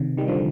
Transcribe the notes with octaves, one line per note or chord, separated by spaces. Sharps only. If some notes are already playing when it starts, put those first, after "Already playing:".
Already playing: C3 D#3
D#3 G3
D3 F3